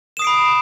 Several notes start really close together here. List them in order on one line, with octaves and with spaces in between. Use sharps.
E7 D#6 C7 D7 B5